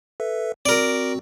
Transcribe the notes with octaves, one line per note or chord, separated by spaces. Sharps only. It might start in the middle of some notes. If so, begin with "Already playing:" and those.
A4 B4 E5
C4 F#4 A#4 D5